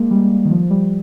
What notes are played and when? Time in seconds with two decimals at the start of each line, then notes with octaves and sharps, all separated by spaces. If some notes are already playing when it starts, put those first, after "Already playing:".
Already playing: G#3 A#3
0.11 G3
0.45 D#3
0.51 F3
0.71 G3